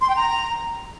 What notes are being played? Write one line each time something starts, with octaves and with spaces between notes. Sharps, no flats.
C6
G5
A#5